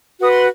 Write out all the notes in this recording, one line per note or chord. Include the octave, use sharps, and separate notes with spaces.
F#4 B4 D#6
C6